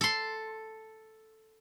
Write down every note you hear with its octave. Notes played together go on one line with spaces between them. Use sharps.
A4 C6